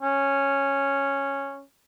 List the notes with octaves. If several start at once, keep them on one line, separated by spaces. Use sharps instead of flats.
C#4